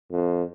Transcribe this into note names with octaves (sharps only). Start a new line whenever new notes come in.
F2